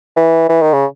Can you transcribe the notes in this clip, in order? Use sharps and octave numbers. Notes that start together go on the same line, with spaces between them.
E3
E3
D#3
C#3